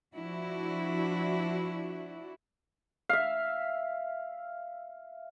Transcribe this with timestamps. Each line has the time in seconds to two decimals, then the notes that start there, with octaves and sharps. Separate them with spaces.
0.14 F3 D4 E4 F#4
3.09 E5 F5